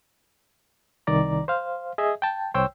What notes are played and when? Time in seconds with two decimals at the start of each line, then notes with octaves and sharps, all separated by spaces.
1.07 C2 D#3 D5 A#5
1.48 C5 F5
1.98 G#4 D#5 E5
2.22 G5 A5
2.54 C2 C5 C#5 G5 E6